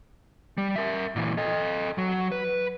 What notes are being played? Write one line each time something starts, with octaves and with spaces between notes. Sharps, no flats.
G3
A#4 E5
A#2 E3
A4 D#5
F#3
B4